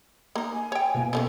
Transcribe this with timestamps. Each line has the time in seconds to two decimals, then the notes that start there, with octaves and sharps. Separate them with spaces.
0.36 A#3 D#4
0.53 G#5
0.72 C#5 G5
0.95 B2 A#3
1.13 F3 B3 C#4 A4